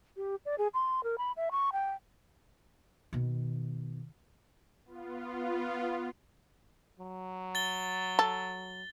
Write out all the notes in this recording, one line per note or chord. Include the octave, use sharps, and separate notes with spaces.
G4
D5
G#4
C6
A#4
B5
E5
C#6
G5
B2 D#3
B3 F4
F#3
A6 G7
A4